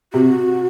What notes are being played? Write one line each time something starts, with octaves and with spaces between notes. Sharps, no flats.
C3 F#4